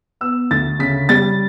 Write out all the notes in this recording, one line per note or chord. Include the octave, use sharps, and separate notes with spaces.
B3 E6
D2 A6
C#3 B6
G3 A6